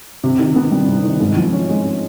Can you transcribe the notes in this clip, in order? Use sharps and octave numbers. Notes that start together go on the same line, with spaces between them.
C3
D#3
B3
G3
C3
D#3
G#2
F3
C#4
G#3